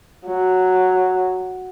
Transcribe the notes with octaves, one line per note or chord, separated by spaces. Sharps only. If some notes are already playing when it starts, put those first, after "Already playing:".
F#3